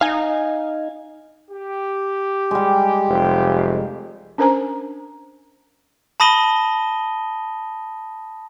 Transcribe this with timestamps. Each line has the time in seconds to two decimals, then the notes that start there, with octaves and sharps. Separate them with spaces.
0.01 D#4 F5 G#5
1.51 G4
2.51 G3 G#3
3.09 F1
4.38 C#4 D4 A#4 C5 G#5 A#5
6.20 A5 B5 D#6 A#6 D#7 G7